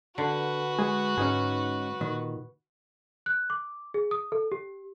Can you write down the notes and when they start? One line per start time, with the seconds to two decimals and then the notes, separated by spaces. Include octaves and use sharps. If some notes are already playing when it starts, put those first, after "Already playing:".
0.18 D3 F#4 B4
0.79 G#3 G#4
1.18 G#2 C#4 D#4 G#4
2.01 A#2 D#3
3.26 F#6
3.50 D6
3.94 G#4
4.11 D#6
4.32 A4
4.52 G4